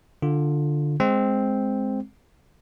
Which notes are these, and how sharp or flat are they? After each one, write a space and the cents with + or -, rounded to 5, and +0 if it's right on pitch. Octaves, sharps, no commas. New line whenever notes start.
D3 +5 F4 +10
G#3 +0 C4 +0